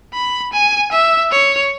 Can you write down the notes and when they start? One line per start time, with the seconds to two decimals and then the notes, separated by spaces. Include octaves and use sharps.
0.14 B5
0.53 G#5
0.92 E5
1.32 C#5